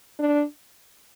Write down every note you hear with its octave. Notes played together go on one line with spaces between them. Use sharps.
D4